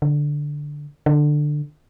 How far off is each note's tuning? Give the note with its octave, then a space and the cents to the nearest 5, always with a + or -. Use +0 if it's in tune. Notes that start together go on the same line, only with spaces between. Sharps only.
D3 +0
D3 +15